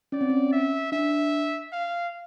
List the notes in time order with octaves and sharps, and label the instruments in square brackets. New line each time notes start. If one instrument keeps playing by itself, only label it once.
[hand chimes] C#4 [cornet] D5
[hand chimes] C4
C#4
[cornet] E5
[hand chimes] D4 [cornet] E5
[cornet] F5